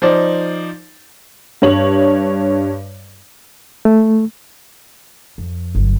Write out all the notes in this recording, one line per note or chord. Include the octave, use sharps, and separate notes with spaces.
F3 D#4 C5 D5
G2 G3 C#5 F#7
A3
F2
G1 F#3